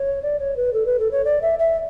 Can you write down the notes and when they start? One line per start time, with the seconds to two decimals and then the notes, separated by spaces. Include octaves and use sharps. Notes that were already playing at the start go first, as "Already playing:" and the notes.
Already playing: C#5
0.22 D5
0.39 C#5
0.56 B4
0.73 A4
0.86 B4
0.99 A4
1.11 C#5
1.25 D5
1.42 E5
1.59 E5